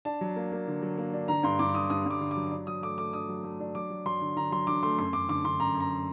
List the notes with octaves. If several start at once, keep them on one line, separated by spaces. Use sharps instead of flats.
D4 A5
F#3
A#3
A#3
D3
F#3
A#3
D4
D3 A#5
G2 C6
G2 D6
D3 D#6
G2 D#6
G2 D6
D3
D6
F#3
D4
F#3 D#6
A3 D6
A3 D6
D4 D#6
F#3
A3
D4
F#3 D6
F#3
F#3 C6
D3
D3 A#5
F#3 C6
D3 D6
A3 C6
F#2 C6
F#2 D6
D3 D6
D3 C6
F#2 A#5
F#2
A#5